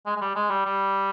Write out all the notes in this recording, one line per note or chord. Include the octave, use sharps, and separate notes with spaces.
G#3
G#3
G3
G#3
G3
G3